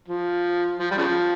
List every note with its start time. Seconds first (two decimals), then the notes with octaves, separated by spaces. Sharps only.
0.08 F3
0.79 F3
0.91 G3
0.98 C#3 F3